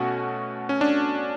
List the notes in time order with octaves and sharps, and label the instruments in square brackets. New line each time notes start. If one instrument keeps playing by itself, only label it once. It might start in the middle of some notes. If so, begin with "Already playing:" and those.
Already playing: [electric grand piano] B2 A3 C#4 F#4
C#4
D4